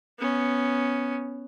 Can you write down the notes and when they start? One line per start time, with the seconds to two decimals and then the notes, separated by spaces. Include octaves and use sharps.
0.19 B3 C#4